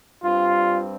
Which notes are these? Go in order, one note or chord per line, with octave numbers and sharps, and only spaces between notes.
G2 G3 C4 F4